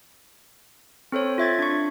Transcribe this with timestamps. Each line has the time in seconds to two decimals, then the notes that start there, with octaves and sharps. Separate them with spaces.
1.12 C4 A4 C5 C#5
1.38 F4 E5 G#6 A6
1.59 D4 C#6